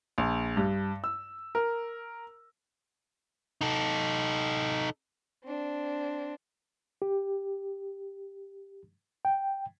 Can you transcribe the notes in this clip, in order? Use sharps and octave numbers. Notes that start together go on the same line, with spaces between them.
A#1
G2
E6
A#4
D#4 A4
C4 D4
G4
G5